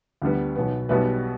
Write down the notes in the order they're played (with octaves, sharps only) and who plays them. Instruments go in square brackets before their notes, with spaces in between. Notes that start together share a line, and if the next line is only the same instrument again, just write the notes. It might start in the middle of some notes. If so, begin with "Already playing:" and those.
[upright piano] D2 D3 G3 B3
B1 B2 B3
B1 B2 G3 B3 B4 E5